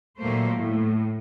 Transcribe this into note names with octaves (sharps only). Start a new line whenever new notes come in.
D#2 A#2 F#3 A3 A#3 C5
A2